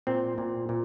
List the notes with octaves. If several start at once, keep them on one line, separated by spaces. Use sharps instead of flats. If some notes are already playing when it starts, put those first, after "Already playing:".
A#2 C4
A#2
A#2